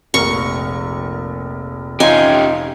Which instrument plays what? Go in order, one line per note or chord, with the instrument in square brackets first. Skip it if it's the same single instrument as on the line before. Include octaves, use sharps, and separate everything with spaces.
[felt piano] F1 A#1 A#4 [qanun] C#6
[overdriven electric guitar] C#4 G4 [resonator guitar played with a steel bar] D#4 F4 [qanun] G#5